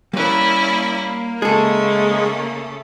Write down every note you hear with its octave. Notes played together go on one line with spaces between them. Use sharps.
G3 A#3 C#4 E4 B4 D5
C#3 G#3 A3 G#4 A4